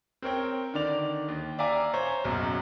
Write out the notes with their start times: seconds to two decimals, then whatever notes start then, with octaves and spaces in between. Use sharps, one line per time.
0.22 C4 A#4 C#5 G5
0.74 D3 D#3 D5 F7
1.28 D#2
1.59 D5 E5 F5 G#5 A#5 D6
1.94 C5 C#5 A#5
2.24 F#1 B1 F#2